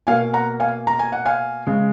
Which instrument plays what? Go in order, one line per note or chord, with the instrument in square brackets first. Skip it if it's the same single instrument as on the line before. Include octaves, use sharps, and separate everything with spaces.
[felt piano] B2 A#3 F5 G#5
F#5 A#5
F5 G#5
A#5
G#5
F#5
F5 G#5
C#3 G#3